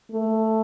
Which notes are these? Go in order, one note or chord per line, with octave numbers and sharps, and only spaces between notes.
A3